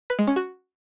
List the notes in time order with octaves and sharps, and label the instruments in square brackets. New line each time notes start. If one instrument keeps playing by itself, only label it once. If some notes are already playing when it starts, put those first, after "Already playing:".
[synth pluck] B4
G#3
C#4
F#4